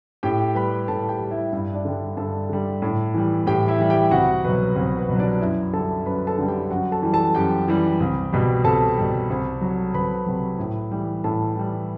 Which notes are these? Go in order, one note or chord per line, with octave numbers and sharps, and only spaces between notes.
A2 G4 G5
G3 B4 B5
A2 A4 A5
G4 G5
G3
E4 E5
G2 E4 E5
D4 D5
D3 G3
G2 A4 A5
D3 G3
A2
E3 G3
A2 G4 G5
E4 E5
E3 G3
G4 G5
C2 F#4 F#5
B2 F#3 B4
C2 B4
B4
B2 F#3
D4 D5
F#2 E4 E5
D3 G3 A4 A5
F#2 B4 B5
A4 A5
D3 G3
G4 G5
F#2 F#4 F#5
A4 A5
E3 G3
A4 A5
F#2 G4 G5
E3 G3
C2
B2 G3
C2 A4 A5
B2 G3
C2
C3 F#3
C2 B4 B5
C3 F#3
A2
E3 G3
A2 A4 A5
E3 G3